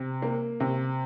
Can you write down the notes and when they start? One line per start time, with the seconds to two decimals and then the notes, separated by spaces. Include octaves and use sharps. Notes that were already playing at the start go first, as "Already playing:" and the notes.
Already playing: C3
0.22 A#3
0.60 C3